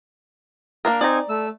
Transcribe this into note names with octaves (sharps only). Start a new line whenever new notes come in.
A#3 D4 A#4
C4 D#4 D5 G#5 A#5
A3 E6